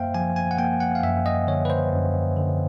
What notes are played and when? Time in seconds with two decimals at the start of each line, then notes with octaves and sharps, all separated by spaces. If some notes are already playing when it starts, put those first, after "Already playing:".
Already playing: F#2 A#3 C5 E5 F5 G5
0.14 F3 G#5
0.36 G#5
0.51 F#5
0.58 A#3 G5
0.80 F#5
0.95 F5
1.03 F#2 E5
1.26 D#5
1.47 D3 C#5
1.65 B4
1.70 C5
1.93 F#2
2.36 D3